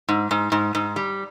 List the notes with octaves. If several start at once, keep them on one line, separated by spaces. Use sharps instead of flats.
G#2
G#2
G#2
G#2
G3